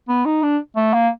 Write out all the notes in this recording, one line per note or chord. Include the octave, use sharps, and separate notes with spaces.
B3
D#4
D4
A3
A#3